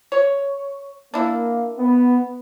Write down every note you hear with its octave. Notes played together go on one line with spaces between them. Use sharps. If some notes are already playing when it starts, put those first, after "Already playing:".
C#5
A#3 D4 E4
B3